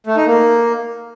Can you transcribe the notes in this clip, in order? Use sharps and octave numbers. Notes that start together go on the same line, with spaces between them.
A3
D#4
A#3